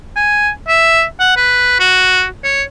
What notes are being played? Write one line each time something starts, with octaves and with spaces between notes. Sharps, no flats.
G#5
E5
F#5
B4
F#4
C#5